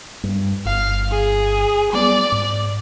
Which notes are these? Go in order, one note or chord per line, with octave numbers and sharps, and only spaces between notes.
G2
G1 F5
G#4
F#3 G3 B3 D5
G#2